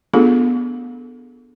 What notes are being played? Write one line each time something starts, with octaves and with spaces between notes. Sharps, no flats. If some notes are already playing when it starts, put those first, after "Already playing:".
A3 B3 D4 F4 G#4 A4